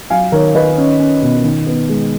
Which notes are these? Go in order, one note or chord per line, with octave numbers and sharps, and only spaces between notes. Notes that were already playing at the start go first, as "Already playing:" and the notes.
F#3 F5 G#5
D#3 A#4 C#5
D#3 B4 D#5
C#4
C#4
B2
D#3
B3
G#3